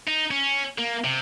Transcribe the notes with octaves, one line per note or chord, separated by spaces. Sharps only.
D#4
C#4
A#3
C3